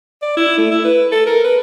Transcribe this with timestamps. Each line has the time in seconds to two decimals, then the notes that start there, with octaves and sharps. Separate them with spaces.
0.22 D5
0.37 E4
0.58 A3
0.71 E4
0.84 B4
1.12 A4
1.26 A#4
1.44 B4